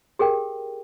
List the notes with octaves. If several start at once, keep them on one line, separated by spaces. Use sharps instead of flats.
G4 G#4 A#4 G5